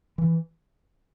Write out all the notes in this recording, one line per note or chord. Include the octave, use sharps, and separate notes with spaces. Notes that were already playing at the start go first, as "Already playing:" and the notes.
E3